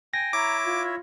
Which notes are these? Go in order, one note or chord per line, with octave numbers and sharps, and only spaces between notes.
G5 G#5 A#6
E4 C#5 E5 A#5 D6
F4